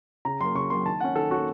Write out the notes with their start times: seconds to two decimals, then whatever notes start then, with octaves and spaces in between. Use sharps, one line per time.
0.25 C#3 A#5
0.40 F#3 A#3 C6
0.55 C#3 C#6
0.70 F#3 A#3 C6
0.86 D#3 A5
1.00 A#3 C#4 F#5
1.16 D#3 A4
1.31 A#3 C#4 F#4